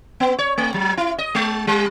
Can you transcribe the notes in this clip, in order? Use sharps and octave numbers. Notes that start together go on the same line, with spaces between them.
B3
C#5
A3
F#3
E4
D#5
G#3
G3